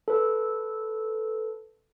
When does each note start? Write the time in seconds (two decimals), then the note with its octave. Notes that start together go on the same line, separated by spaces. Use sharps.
0.08 A4 B4